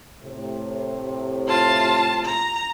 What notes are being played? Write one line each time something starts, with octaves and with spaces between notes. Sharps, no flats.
A2 C3
F4 A5
A#5